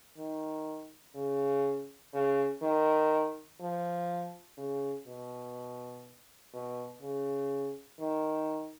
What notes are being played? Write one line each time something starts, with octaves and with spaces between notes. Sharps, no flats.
D#3
C#3
C#3
D#3
F3
C#3
B2
B2
C#3
D#3